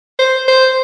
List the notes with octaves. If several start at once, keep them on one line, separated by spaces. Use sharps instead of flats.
C5
C5